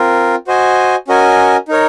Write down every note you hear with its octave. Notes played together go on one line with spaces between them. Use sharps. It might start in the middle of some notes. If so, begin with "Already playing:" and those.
Already playing: C4 F4 A#4
F#4 C5 D#5 G#5
C#4 F#4 A#4 D#5 G#5
D#4 A#4 C#5